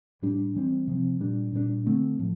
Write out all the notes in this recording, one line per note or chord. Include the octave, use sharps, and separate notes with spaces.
A2 G3 D4
E3 G3 C4
C3 F3 C4
A#2 G3 D4
A#2 G3 A#3 D4
D3 A3 C4
A2 F3